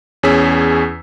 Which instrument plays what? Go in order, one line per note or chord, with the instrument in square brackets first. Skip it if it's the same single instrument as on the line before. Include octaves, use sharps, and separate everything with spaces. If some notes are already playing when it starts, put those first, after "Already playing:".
[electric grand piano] E2 C#4 G#4 E6 B6